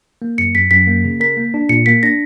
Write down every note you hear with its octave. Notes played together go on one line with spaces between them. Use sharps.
A#3
F#2 C#7
F#2 B6
F#2 B6
A#3
C#3
A#4 B6
A#3
D4
A#2 C#7
A#3 B6
D4 A#6